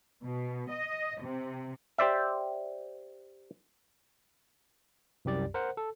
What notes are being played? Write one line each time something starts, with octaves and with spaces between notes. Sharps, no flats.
B2
D#5
C3
G4 C5 D5 E5
C2 F#2 G4 D5
A#4 C5 F#5
A4